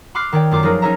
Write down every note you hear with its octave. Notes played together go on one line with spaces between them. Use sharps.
B5 C6 D6 F6 F#6 C7
D#3 C#5 D5 G5
F#2 A3 F4 C6 D6
F3 F#3 D#4 G#4 A#4 B4
C#4 D#4 G#4 C#5 E5 A#5